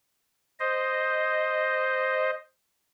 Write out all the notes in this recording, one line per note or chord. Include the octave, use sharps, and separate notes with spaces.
C5 D#5